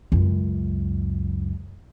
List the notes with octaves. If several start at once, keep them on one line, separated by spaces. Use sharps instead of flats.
C#2 F#2